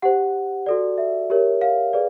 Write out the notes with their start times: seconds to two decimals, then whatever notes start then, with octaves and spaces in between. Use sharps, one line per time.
0.02 G4 C5 F#5
0.66 F#4 A4 D5
0.98 E5
1.30 G4 A#4 C#5
1.61 F5
1.93 G#4 B4 D5